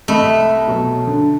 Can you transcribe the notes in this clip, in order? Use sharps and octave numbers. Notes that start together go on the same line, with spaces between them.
C2 A3 D#5 B5
B2 F#3
D3